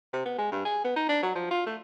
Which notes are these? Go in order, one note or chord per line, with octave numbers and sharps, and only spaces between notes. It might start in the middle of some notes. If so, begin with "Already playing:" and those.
C3
B3
G#3
G2
G#4
B3
D#4
D4
F#3
F3
F4
A3